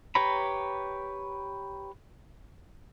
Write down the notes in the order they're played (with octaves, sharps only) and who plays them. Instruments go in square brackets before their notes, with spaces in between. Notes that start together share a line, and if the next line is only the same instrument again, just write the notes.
[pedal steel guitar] G4 B4 C#5 A#5 B5